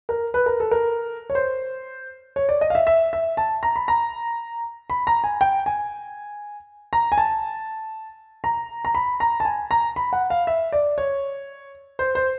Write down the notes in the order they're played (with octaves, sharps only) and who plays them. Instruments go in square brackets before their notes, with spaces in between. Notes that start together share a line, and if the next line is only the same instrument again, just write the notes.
[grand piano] A#4
B4
A#4
A4
A#4
C#5
C5
C#5
D5
D#5
F5
E5
E5
E5
A5
A#5
B5
A#5
B5
A#5
G#5
G5
G#5
A#5
G#5
A5
A#5
A#5
B5
A#5
A5
G#5
A#5
B5
F#5
F5
E5
D5
C#5
C5
C5